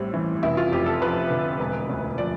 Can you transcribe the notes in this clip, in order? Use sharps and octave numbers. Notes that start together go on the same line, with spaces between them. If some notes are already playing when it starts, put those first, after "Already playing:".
Already playing: A1 A2 G3 C4
E3
F1 E4
F4
F2 G4
A4
F3 B4
D3
E1
D2
F3 D5